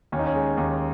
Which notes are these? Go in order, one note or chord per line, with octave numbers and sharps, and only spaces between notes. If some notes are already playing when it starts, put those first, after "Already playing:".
D#2 C#4
D#4
C#4
G#3
D#2